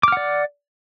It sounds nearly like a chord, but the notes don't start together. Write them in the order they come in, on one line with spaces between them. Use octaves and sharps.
D6 F6 F#5 D5